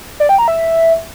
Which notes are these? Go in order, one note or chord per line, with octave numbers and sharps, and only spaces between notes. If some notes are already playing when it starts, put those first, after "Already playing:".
D5
G5
A#5
E5